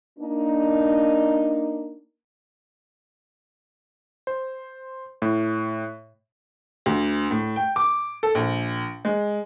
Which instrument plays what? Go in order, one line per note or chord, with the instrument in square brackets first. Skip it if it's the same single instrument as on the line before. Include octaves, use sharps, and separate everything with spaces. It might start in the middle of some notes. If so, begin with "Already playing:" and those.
[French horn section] A#3 D4 D#4
[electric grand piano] C5
A2
[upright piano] D2
A2
G5
D6
A4
A#1
G#3